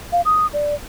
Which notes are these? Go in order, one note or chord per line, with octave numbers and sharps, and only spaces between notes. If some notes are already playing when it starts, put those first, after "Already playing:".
F5
D#6
D5